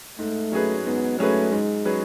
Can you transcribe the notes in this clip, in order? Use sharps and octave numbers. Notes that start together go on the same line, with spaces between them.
G#2 A3
F#3 C#4 G#4 B4
G#2 B3
F#3 A3 C#4 G#4 B4
G#2 G#3
F#3 C#4 G#4 B4